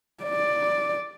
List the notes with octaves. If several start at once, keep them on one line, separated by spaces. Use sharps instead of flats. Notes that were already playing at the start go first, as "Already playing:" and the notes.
D5